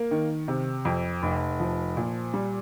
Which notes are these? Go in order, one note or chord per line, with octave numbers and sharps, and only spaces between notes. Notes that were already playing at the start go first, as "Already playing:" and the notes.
Already playing: A#3
D#3
C3
F2
F1
F3
A#2
G3